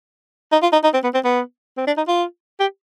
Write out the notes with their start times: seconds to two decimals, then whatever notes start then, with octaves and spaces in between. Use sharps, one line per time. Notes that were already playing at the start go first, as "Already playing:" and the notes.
0.52 D#4
0.62 F4
0.73 D#4
0.84 D#4
0.94 C4
1.04 B3
1.14 C4
1.25 B3
1.77 C4
1.87 D4
1.97 D#4
2.08 F4
2.60 G4